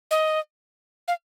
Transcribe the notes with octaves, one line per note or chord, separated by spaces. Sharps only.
D#5
F5